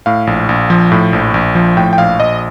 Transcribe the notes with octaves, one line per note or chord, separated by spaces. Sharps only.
A2 F5
A#1
A#1
F3
A2
A#1
A#1
F3
A2 G5
G5
A#1 F5
A#1 D#5